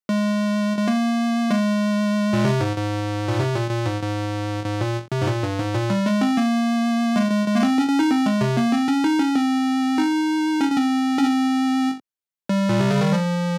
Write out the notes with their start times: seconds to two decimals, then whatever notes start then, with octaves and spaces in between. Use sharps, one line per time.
0.09 G#3
0.78 G#3
0.88 A#3
1.51 G#3
2.33 A#2
2.45 C3
2.60 G#2
2.76 G#2
3.28 A#2
3.39 C3
3.55 A#2
3.70 A#2
3.86 G#2
4.02 G#2
4.65 G#2
4.81 A#2
5.12 C3
5.22 G#2
5.27 A#2
5.43 G2
5.59 G#2
5.75 A#2
5.90 G3
6.06 G#3
6.21 C4
6.37 A#3
7.16 G#3
7.31 G#3
7.47 G#3
7.55 A#3
7.63 C4
7.78 C#4
7.88 C#4
7.99 D#4
8.10 C4
8.26 G#3
8.41 C3
8.57 A#3
8.72 C4
8.88 C#4
9.04 D#4
9.19 C#4
9.35 C4
9.98 D#4
10.61 C#4
10.71 C#4
10.77 C4
11.18 C#4
11.24 C4
12.49 G3
12.69 A#2
12.80 C3
12.91 C#3
13.01 D#3
13.12 F3